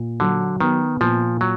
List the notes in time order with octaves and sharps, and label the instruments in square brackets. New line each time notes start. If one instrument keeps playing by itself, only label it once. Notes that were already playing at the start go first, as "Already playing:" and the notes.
Already playing: [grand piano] A#2
[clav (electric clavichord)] D3 [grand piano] F#3
[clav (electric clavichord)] D#3 [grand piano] B3
[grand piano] A#2 [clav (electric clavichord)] F3
[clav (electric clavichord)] F#3